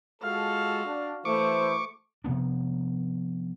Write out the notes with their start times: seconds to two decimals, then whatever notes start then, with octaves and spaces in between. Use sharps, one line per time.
0.22 G#3 F4 F#4 A4 F5
0.86 D4
1.25 E3 A3 E4 C5 C#6 D6
2.24 C3 F3 B3 D4